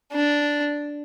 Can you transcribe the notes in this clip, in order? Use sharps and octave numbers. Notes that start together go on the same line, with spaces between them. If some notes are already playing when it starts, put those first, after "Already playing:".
D4